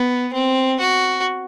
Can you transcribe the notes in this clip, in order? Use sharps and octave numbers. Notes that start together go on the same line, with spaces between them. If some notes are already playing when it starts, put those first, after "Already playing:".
Already playing: B3
C4
F#4